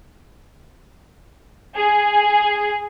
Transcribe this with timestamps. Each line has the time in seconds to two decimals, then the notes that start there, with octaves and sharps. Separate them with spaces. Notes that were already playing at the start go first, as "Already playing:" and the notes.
1.75 G#4